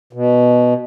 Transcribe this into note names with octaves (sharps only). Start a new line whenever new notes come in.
B2